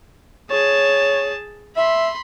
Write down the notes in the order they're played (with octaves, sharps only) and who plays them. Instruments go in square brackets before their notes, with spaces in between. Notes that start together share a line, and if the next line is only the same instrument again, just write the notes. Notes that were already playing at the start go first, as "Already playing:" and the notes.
[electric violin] G#4 A5 [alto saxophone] C#5
[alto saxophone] E5 [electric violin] B5 C6